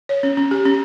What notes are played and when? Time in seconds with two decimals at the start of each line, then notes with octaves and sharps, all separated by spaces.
0.09 C#5
0.23 C#4
0.37 C#4
0.51 G4
0.65 C#4